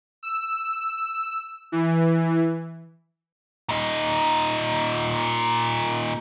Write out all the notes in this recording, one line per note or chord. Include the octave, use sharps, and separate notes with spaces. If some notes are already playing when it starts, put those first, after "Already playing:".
E6
E3
A#2 D#4